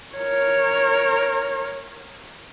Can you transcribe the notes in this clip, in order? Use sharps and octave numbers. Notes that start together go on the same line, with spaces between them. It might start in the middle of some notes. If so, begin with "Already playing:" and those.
A#4 C#5